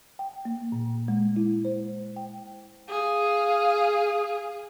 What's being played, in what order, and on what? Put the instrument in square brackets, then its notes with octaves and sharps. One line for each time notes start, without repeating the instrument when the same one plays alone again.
[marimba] G5
A#3
A#2
G#3
E4
C5
G5
[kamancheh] G#4 F5